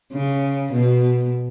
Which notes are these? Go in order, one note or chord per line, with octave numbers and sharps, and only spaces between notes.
C#3
B2